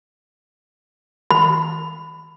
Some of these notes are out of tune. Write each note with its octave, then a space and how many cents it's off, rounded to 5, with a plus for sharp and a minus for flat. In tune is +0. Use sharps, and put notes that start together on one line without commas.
B5 +20